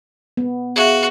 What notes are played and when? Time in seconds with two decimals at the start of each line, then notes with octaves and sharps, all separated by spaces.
0.37 B3
0.76 F#4 G#4 E5 F5